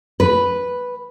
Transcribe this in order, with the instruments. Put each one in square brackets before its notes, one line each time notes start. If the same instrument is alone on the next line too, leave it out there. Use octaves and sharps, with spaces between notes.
[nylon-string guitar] B4